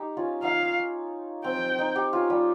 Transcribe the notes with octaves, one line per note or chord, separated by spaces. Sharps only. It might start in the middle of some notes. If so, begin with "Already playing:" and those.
Already playing: D#4 G4
C#4 F4
D#4 F5
C4 G5
D#4
D#4 G4
C#4 F4
G3